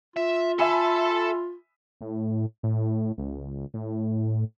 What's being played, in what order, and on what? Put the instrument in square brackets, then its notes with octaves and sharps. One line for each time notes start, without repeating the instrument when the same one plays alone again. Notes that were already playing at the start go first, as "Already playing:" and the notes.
[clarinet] F4 [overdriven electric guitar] E5
[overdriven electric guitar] A4 A5 [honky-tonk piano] E5 G#5 B5
[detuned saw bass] A2
A2
C#2
A2